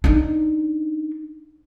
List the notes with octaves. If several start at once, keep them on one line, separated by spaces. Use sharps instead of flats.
D4 D#4